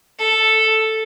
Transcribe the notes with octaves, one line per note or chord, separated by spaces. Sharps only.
A4